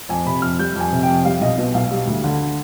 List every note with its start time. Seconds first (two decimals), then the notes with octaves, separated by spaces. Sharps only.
0.09 F2 G#5
0.26 C3 B5
0.42 F2 F6
0.59 G3 G6
0.75 F2
0.80 G#5
0.92 C3
1.03 G5
1.08 F2
1.25 G3 F5
1.41 B1 D#5
1.58 B2 D#5
1.74 B1 F5
1.91 G3
2.07 D2
2.24 D3